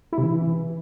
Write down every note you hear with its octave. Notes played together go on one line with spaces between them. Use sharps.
E4
C3
E3